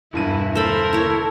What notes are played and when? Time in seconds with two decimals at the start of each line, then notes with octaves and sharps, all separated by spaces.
0.13 E1 G2 E4 D#7
0.55 A4 A#4 C5 B5
0.93 E4 C#5